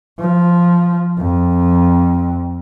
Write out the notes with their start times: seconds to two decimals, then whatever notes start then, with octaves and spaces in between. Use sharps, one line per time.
0.19 F3
1.19 F2